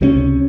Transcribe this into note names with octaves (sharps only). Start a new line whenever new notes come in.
C#2 C3 G3 C#4